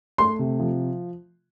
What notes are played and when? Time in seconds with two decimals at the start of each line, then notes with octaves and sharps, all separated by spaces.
0.18 A3 C6
0.39 C3
0.60 F3